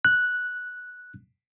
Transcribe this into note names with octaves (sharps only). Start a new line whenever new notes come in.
F#6